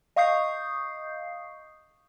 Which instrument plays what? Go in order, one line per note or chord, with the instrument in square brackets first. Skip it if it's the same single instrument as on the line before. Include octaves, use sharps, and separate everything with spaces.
[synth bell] D#5 F5 C#6 D#6 G6 C7